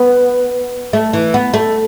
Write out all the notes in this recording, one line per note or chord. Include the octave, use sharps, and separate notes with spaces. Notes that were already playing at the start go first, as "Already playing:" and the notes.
Already playing: B3
A3
E3
B3
A3